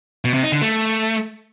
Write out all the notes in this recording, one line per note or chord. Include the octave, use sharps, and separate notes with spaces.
B2
C3
D#4
D3
A3